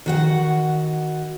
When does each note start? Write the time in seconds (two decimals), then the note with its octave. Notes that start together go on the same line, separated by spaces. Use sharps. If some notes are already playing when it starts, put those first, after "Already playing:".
0.06 D#3 F#4 F#5